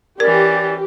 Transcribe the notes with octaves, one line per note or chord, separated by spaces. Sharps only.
E3 C#4 G4 A#4 D5